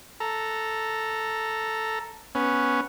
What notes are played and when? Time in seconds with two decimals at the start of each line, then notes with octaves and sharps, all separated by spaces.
0.20 A4 A#5
2.35 B3 C#4